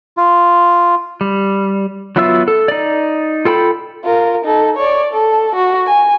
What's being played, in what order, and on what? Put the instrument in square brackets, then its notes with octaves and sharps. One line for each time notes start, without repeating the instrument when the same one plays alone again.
[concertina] F4
[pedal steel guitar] G3
F#3 B3 F4 E5 E6
A4
D#4 D5
F4 A4 G5 B5
[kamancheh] F4 A#4
D#4 A4
C#5 D5
A4
F#4
G#5